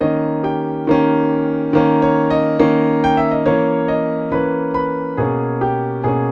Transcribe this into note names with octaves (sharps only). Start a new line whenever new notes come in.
D#3 A#3 C#4 D#5
G4 G5
D#3 A#3 C#4
D#3 A#3 C#4
C#5
D#5
D#3 A#3 C#4
G5
E5
D#5
E3 A#3 C#4 C#5
D#5
E3 A#3 C#4 B4 B5
B4 B5
B2 A#3 C#4 G#4 G#5
G4 G5
B2 A#3 C#4 G#4 G#5